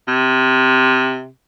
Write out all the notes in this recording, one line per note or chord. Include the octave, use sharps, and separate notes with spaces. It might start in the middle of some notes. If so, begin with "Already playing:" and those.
C3